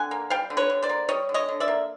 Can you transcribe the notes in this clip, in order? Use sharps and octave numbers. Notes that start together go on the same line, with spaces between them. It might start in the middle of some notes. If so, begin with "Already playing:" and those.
Already playing: D3 F#5 G#5
A#3
G3 F5 G5
D3
B4 C#5
D3
C5 D5
A#3
G3 C#5 D#5
D3
C#5 D#5
D3
D5 E5
A#3